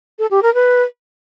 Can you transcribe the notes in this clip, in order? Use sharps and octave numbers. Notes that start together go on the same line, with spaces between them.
A4
G4
A#4
B4